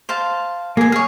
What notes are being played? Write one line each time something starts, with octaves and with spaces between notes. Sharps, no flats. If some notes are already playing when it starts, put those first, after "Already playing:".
C5 F5 A5
A#3 G#4 G#5
G#4 C#5 F6